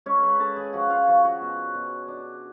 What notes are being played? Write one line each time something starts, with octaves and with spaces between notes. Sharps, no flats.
G#3 C#4 C#5
B4 B5
C#4 A4 A5
G#4 G#5
F3 F#4 F#5
F4 F5
F3 F#4
F#4
B2
B2
D4